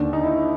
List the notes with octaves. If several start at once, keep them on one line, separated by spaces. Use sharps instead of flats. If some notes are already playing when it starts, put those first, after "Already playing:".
Already playing: D#2 D3 D4
D#4
E4